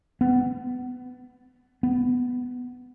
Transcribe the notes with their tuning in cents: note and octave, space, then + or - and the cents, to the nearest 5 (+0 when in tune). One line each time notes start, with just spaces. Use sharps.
B3 +20
B3 +10